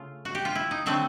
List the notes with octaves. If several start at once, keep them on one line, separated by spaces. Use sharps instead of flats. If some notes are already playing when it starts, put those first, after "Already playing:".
Already playing: C#3 A3 F4
F#4
G4
F4
E4
D#4
D3 F#3 A3 C4